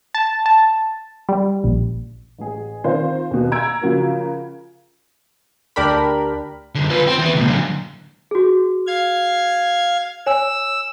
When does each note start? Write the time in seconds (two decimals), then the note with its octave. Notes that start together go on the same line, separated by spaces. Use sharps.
0.15 A5
0.46 A5
1.29 G3
1.64 A#1
2.38 A1 G#4
2.84 D#3 C4 F4 C5
3.31 D#2 B2
3.52 A#5 E6 G#6 D7
3.81 C#3 F3 F#4 A#4
5.76 D2 D4 G4 A#4 B5
6.75 F#2 D3
6.90 F4 B4
7.07 C4
7.19 E3 B3
7.35 C#2 A#2
7.48 D3 F#3
8.31 F#4 G#4
8.87 F5 G#6
10.26 C#5 G#5 E6